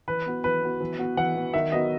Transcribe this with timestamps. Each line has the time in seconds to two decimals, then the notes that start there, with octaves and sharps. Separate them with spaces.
0.08 E3 B4
0.26 B3 F#4
0.44 E3 B4
0.62 B3 F#4
0.80 E3
0.98 B3 F#4
1.17 E3 F#5
1.36 B3 F#4
1.54 D#3 E5
1.72 F#3 B3 D#4 F#4 D#5